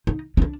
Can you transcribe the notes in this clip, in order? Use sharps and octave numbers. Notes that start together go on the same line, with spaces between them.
D#4
C#4
D4